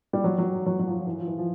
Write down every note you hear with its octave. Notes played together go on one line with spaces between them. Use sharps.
G3
F#3
F#3
F#3
F#3
F3
E3
F3
E3
F3